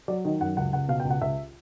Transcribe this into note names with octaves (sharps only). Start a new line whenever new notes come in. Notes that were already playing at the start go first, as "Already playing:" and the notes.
F#3 D5
D#3 D#5
F#2 F#5
C#2 F#5
C#2 F#5
B2 F5
G5
C#2
F#5
C#2 E5